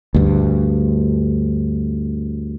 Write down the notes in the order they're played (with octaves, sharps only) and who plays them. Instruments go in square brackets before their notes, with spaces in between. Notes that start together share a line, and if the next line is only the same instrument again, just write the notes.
[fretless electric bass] D2 G2